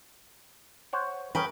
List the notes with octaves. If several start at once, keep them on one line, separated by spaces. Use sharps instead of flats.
C5 C#5 F#5
C#4 G#4 A#4 B4 G5